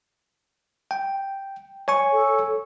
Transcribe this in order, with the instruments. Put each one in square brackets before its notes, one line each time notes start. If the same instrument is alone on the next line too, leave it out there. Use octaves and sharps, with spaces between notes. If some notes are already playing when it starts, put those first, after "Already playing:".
[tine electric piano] G5
C#5 G#5 C#6
[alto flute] A4